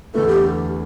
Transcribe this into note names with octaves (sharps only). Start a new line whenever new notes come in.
E2 D3 A3 E4 A4 B4
G4